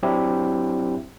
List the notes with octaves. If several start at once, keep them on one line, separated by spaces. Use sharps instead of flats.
F#3 C4 D4 E4 G4